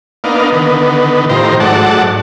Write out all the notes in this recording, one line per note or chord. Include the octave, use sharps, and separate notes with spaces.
A#3 B3 D4 D#4 F5
D3 D#3 B3
A2 D#3 F3 G4 C5 A#5
G#2 F#3 A3 D5 F#5 A5